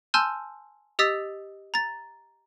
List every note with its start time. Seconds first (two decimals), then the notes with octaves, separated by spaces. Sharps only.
0.14 G#5 A5 C6 E6 F6 G6
0.99 G4 D#5 D#6 E6 A6 B6
1.74 A#5 A6